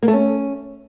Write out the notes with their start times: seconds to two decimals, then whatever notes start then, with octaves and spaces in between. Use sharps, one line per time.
0.03 A#3
0.08 A3
0.13 C#4